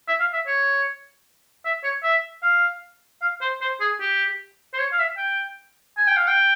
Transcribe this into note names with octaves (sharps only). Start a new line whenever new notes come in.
E5
F5
E5
C#5
E5
C#5
E5
F5
F5
C5
C5
G#4
G4
C5
C#5
F5
E5
G5
G#5
G5
F5
G5